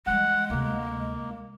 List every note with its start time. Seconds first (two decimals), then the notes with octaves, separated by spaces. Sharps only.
0.07 E3 G3 G#3 F#5
0.50 D2 C3 A#3